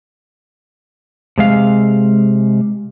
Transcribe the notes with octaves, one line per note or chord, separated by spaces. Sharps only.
C3 G#3 F5